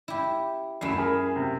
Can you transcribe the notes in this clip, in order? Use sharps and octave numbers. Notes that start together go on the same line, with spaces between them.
E4 G4
F#2 A3 E4 C7 E7
G#4 A#4 B5
C3